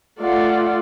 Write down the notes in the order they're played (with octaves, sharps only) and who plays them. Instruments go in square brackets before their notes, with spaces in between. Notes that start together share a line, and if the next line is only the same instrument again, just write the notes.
[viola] A3 F4 [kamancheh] D5 F#5